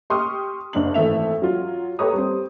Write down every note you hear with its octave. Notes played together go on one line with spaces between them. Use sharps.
G4 C6 C#6 D#6 F6
F#1 D4 F#7
G#1 E3 A3 E5 F7
F#3 F4
G4 A4 B4 C#5 A#5 D#6
G3 C4